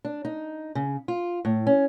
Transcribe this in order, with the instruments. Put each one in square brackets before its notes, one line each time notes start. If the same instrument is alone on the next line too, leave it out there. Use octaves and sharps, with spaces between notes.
[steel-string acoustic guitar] D4
D#4
C#3
F4
A2
C#4